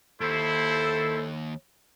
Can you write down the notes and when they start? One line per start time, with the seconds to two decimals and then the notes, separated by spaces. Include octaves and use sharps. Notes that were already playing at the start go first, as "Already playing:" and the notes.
0.21 D#2 E4 A4 C5